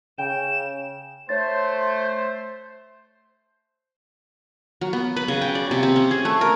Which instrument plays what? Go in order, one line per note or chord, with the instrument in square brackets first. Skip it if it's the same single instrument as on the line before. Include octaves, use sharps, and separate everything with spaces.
[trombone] C#3 [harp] G5 [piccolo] E7
[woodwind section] A3 C5 [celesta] C#5 A6
[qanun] F#3
B3
B4
C#3
G5
D5
C3
C4
C#4
G#4
A3
A#4